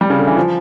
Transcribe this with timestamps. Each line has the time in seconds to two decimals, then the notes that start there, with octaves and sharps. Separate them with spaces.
0.01 G3
0.10 C#3
0.19 D3
0.27 E3
0.37 F3